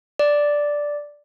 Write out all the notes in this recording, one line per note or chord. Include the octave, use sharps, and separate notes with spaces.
D5